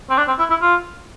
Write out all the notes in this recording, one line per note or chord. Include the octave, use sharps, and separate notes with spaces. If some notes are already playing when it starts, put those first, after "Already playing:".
C4
D4
C4
E4
E4
F4